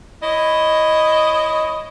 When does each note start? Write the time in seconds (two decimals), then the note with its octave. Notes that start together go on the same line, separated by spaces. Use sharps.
0.23 E4 C#5 D#5